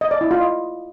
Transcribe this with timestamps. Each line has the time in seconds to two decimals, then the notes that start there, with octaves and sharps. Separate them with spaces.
0.01 D#5
0.11 D5
0.21 E4
0.31 F4
0.41 D#5